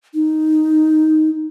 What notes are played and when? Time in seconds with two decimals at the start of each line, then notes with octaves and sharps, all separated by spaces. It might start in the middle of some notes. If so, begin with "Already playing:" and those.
0.14 D#4